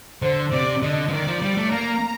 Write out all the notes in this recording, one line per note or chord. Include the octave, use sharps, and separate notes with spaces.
D3 C5
C3 D5
D3 D#5
F3
D#3 D5
F3
G3
A3
A#3 A#5